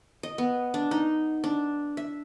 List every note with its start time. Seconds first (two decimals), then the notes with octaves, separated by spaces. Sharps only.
0.23 D#5
0.38 B3
0.74 D4
0.91 D#4
1.44 D4
1.97 E5